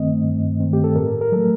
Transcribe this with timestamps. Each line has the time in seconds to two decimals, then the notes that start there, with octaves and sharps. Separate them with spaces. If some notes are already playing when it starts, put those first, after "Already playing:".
Already playing: G2 D#3 A3 C4 D#5
0.24 G2
0.60 D#3 A3 C4
0.73 G4
0.84 A4
0.96 A2 A#4
1.21 A#4
1.32 F#3 A3 A4